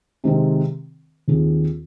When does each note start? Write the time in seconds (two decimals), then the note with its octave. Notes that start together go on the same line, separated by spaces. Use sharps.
0.24 C3 D#3 G#3 C4
1.28 D#2 D#3 C4 F4 G#4